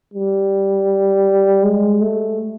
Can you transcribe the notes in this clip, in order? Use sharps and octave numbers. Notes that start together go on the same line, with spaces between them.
G3
G#3
A3